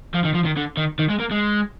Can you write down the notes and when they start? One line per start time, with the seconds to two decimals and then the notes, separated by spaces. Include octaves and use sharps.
0.14 F3
0.25 D#3
0.35 F3
0.45 D#3
0.57 D3
0.77 D#3
0.99 D#3
1.10 G#3
1.20 A#3
1.31 G#3